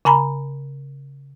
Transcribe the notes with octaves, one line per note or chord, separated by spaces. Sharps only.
C#3 G#5 A#5 B5